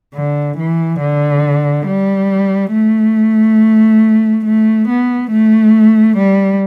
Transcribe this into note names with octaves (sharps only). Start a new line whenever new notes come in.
D3
E3
D3
G3
A3
A3
B3
A3
G3